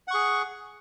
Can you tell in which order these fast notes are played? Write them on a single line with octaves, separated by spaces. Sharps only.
F#5 C#6 G#4